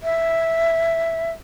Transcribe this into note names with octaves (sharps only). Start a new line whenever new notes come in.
E5